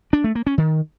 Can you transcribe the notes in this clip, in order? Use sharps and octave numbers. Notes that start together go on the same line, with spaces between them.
D4
A3
A#3
C#4
D#3